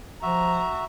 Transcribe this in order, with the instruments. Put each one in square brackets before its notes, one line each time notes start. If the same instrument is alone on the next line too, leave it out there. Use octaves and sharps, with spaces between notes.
[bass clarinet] F3 [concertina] F#4 E5 [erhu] A#5